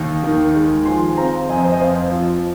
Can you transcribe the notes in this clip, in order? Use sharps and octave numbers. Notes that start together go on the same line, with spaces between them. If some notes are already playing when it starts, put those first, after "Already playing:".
Already playing: D#2 D#4
D#3
G#3
F3 G#5 C6
C4 F5 A#5
F2 D#5 G#5
C5
D#5
F2 C5 F5
F3